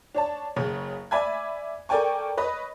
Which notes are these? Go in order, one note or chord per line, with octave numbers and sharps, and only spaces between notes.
D4 C#5 A5
F#1 C#3 C#5
D5 E5 G#5 B5 G#6
A4 A#4 D5 G5 G#5 C#6
B4 C#5 D#5